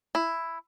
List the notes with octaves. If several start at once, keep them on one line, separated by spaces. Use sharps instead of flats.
E4